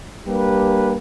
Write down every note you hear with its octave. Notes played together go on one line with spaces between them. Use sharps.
G3 A#3 D4 G4 B4